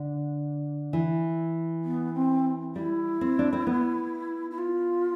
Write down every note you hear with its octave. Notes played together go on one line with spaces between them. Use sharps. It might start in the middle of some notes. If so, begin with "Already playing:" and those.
Already playing: D3
E3
B3
C4
G3 E4
C4
D4
C4
B3
E4
F4